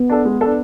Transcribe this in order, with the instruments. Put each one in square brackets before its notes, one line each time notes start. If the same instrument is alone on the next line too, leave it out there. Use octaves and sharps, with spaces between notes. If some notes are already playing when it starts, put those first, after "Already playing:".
Already playing: [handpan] B3
[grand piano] D4 A4
G#3
D4 A4